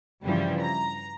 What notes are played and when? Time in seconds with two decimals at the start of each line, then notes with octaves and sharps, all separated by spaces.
0.22 G2 C#3 E3 F3 G3
0.60 A#5